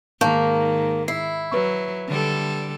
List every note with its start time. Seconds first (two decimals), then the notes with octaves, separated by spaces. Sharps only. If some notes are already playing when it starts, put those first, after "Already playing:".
0.21 G#2 D#3 A#3 A5 C#6 G6
1.08 E4 C7
1.52 F#3 B4 C#6
2.08 D3 G3 A4